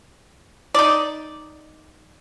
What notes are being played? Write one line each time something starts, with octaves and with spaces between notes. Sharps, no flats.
D#4 D5